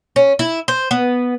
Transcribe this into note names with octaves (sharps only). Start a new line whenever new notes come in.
C#4
E4
C5
B3